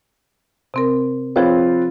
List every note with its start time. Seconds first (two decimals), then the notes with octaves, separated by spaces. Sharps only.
0.74 C3 C4 A#4
1.36 F3 C4 F4 G#4 B4 C#5